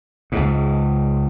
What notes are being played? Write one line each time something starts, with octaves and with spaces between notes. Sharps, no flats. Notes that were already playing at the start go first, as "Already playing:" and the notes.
C#2 G#2